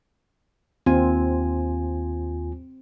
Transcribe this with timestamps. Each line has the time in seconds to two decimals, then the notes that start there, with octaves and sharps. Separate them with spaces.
0.86 D#2 C4 F4 G#5